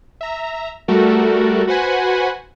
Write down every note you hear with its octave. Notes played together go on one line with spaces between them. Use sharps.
E5 A#5
G3 A3 F#4 A4 A#4
F#4 B4 C5 F#5 G#5 B5